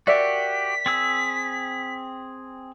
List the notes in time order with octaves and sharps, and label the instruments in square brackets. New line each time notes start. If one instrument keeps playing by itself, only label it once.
[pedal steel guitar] F#4 G4 [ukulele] A#4 D5 E5 [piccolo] B6
[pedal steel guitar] C4 G#4 E6